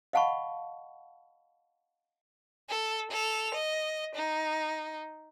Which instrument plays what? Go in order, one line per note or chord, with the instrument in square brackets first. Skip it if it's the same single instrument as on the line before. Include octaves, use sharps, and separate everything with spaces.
[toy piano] D#5 F5 F#5 A5 B5 C#6
[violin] A4
A4 F7
D#5
D#4